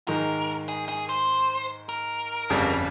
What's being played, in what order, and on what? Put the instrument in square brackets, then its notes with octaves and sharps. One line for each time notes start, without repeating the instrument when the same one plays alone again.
[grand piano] G#2 D#3 G#3 [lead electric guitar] A#4
[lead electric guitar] G#4
G#4
C5
A#4
[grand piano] G1 F2 C#3 G3